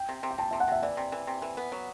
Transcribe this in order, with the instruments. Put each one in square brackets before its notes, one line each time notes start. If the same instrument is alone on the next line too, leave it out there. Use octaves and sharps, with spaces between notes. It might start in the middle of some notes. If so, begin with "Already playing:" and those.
Already playing: [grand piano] G5
[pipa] C3
C3
[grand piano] G5
[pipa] C3 [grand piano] A5
[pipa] C3 [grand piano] E5
[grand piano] F#5
[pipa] C3 [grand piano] E5
[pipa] E3 [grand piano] D5
[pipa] C3
E3
C3
E3
B3
F#3